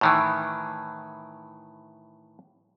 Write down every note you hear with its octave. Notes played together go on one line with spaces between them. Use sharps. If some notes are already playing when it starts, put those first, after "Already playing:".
A2 D#3 E3